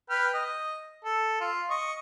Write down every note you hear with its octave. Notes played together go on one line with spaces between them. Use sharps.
B4 G5 F6
D#5
A4
F4
D#5 C#6